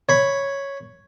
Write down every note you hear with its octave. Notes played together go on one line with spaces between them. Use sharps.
C#5 B5